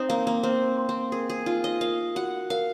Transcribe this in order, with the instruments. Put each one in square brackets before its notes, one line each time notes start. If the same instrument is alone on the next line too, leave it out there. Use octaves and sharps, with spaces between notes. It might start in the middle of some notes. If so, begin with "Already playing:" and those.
Already playing: [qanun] C4 D#4 [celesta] C5
[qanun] A#3 [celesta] F5
[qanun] A#3
[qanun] C4 [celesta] C5
[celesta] C6
[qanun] C4
[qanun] G#4 [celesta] A#4
[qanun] G#4
[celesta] D#4 [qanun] F4
[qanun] D#5
[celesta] A#4 [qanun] F5
[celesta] F#4 [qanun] F#5
[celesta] A#4 [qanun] F5